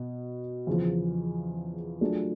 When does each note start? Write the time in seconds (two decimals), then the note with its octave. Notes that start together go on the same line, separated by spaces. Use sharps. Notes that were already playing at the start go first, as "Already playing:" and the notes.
Already playing: B2 B3
0.67 E2 C#3 F3
2.01 F#3 A3 D4 F4 G#4